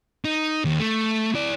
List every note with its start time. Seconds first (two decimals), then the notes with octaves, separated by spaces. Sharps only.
0.25 D#4
0.65 D#2
0.79 A3
1.35 E4 D5